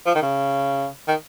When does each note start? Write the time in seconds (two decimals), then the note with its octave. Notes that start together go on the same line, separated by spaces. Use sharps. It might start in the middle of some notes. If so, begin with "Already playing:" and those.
0.06 F3
0.15 D#3
0.22 C#3
1.08 D#3